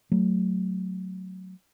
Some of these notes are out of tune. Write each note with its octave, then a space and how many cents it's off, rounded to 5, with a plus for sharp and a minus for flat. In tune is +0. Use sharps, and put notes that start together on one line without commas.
F#3 +0 A3 +0